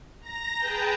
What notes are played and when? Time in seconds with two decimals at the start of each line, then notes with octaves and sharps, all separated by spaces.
0.20 A#5 A#6
0.57 G#4 B4 G5 A5 A#5 G6